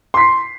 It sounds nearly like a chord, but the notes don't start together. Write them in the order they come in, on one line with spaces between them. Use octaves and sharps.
C6 B6 C7